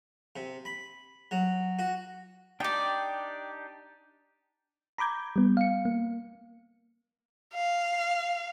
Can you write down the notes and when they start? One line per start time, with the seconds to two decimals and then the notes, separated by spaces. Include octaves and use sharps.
0.36 C3
0.65 B5
1.31 F#3
1.79 F#4
2.60 D4 D#4 G4 D5 G5
4.98 A#5 B5 D6 G6 G#6
5.36 G3 B3
5.57 F5 C#7
5.85 A#3
7.54 F5